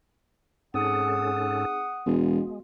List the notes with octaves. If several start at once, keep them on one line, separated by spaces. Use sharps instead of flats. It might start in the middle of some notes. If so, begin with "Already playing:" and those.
G#2 C4 C#4 D#4 G#4 A4 F#5 D#6
E1 G#3 B3 F#4